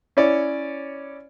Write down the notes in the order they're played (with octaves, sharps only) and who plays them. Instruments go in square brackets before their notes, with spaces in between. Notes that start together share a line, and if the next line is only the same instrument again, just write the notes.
[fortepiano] C#4 E4 C#5 D5